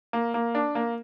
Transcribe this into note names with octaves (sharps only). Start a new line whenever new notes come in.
A#3
A#3
D4
A#3